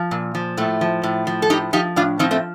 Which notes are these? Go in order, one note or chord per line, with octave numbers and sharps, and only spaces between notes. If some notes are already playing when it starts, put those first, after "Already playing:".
Already playing: F3
A#2
F3
A2 A3
F3
A2
F3
A4
A2 D#4 G4
F3 D#4 G4
A2 D4 F4
F3 C4 D#4
A3 C4